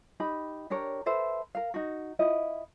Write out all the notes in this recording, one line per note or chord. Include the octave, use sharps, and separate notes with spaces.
D#4 G4 B5
D4 G4 A#4 C#5
A4 B4 C5 E5
A#4 F5
D#4 F#4
E4 F4 D#5